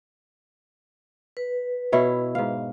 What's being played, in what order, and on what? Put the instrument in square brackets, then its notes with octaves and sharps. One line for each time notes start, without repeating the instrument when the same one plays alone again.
[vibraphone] B4
[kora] B2 E4 C#5
G#2 F5